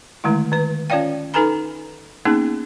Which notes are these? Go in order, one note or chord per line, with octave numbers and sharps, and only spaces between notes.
D3 D#3 G#3 A3 E4
D#3 B4
C#4 F4 C#5 D5 F5 G5
D#4 A4 B4 G#5 A#5 B5
A#3 B3 C#4 D#4 G#4